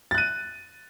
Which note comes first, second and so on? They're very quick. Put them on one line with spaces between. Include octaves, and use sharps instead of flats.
A6 F#6 D#7